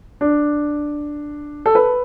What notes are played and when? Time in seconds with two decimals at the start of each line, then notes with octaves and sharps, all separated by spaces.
0.21 D4
1.66 A4
1.75 B4